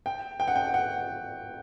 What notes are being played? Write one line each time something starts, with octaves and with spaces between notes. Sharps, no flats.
G5
G5
F#5
G5
F#5